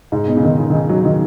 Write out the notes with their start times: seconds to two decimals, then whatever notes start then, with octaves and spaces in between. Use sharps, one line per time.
0.12 G#2
0.28 B2
0.36 C#3
0.44 D#3
0.58 C#3
0.70 D#3
0.74 C#3
0.89 F#3
1.05 D#3